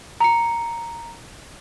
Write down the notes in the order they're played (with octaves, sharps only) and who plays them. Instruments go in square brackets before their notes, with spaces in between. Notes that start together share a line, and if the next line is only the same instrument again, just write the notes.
[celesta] A#5 C#7